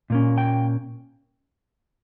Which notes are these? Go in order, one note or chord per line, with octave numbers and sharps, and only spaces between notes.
A#2 A#3 C#4
G5